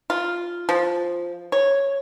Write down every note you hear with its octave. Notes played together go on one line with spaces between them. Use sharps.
F4
F3
C#5